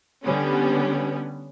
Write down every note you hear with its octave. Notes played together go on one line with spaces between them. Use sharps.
D3 G3 B3 C#4